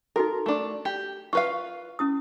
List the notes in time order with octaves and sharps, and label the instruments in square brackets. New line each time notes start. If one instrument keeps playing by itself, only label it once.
[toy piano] D#4 F#4 A4 [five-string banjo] A#4
[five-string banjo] A3 D4
G4
[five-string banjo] F4 B4 F5 [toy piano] C#6
[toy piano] C#4 E4 D#6